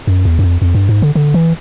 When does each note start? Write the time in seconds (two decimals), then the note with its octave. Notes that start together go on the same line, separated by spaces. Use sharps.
0.07 F#2
0.25 E2
0.39 F#2
0.43 F2
0.62 F2
0.75 G2
0.89 G#2
1.02 D3
1.15 D3
1.34 E3